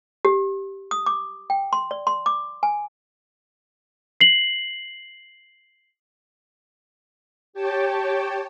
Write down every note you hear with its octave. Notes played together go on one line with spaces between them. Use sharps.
G4
D#6
D6
G5
C6
D5
C6
D6
G#5
C7 F#7
G4 C#5 G5 A5